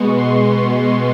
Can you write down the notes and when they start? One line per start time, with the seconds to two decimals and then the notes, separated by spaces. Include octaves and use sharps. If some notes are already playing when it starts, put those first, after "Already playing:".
Already playing: B2 G#3 B3 C#6
0.18 C6
0.58 C#6